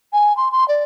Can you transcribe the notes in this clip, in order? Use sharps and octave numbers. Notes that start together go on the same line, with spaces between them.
G#5
C6
C6
D5